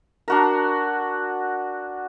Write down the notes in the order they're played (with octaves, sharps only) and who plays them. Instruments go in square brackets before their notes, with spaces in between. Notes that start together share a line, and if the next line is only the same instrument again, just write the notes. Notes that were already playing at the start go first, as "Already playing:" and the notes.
[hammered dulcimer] D4 F#4 A#4